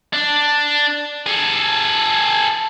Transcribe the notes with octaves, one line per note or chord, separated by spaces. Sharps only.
D4
G#4 A4